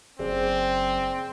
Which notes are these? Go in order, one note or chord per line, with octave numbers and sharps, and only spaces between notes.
F#1 C4 G#4 C5 D5